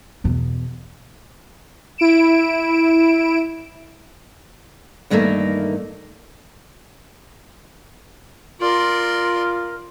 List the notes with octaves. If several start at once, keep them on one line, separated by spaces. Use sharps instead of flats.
E2 B2
E4 D7 E7
E2 G2 D#3 A3 A#3
F4 A#4 D5 C6